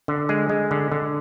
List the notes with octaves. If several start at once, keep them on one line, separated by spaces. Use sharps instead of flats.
D3
G#3 G#4
G#3
D3
D3